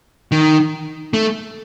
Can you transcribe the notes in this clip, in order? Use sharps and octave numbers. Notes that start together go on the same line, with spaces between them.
D#3
A3